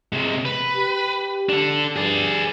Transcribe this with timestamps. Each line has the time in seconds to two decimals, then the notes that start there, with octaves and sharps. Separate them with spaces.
0.13 C3 G#3
0.46 B4
0.76 G4
1.49 D4 A4
1.96 G2 G#4 D5